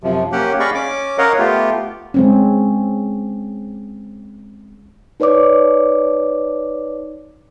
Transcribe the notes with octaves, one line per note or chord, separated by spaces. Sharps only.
F#2 C3 F3
A#3 C#4 G4 F#5
G#4 D5 D#5 F5 B5 C#6
C#4 D6
A#4 C#5 D#5 F5 F#5
A3 B3 F4 G4
G#3 C4 C#4
D#4 B4 C#5 D5 D6